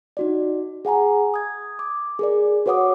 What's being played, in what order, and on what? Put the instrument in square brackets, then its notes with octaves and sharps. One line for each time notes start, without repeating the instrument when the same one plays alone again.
[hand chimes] D#4 F#4 D5
G#4 F#5 G#5 A#5
D#6 G#6
D6
G#4 A#4 D5
F#4 B4 C#5 F#5 D6 D#6